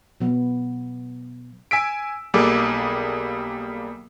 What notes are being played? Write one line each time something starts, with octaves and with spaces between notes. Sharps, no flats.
B2 F#3 B3
G#5 E6 B6 D7
B1 G3 A#3 G#4 A4 D6